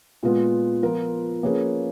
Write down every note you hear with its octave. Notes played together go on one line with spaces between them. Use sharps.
A#2 G#3 B3 F4
F3 B3 F4 A#4
F3 A#3 C#4 G#4 B4